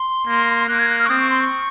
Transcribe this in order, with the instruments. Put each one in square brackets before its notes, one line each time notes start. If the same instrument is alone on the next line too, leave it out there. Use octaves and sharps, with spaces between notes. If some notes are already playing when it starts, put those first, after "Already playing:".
Already playing: [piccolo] C6
[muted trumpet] A#3
[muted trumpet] A#3 [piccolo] F#6
[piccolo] G#6
F#6
F6
C#6
[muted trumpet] C4 [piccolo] D#6
[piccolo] C#6
C6
C#6